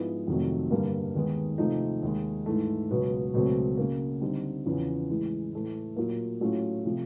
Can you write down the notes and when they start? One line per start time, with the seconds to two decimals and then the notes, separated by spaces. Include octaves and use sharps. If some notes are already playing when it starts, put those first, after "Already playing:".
Already playing: G#2 F3 G#3 B3 E4
0.27 F2 C3 D#3 F#3 A3
0.71 G2 D3 G3 A#3
1.15 D#2 D#3 G#3 B3
1.58 C3 F3 A3 C4 D#4
2.03 D#2 D#3 G#3
2.46 G#2 E3 A3
2.91 C#2 B2 F#3 B3
3.34 C#2 B2 F#3 A3 C4
3.77 C#3 F#3 A#3
4.21 D3 G3 C4 D#4
4.66 E2 C#3 F3
5.10 A2 E3 G#3
5.53 A2 E3 A3
5.96 A#2 F#3 A#3
6.41 A2 F#3 A3 C#4 F4
6.85 C3 F3 A3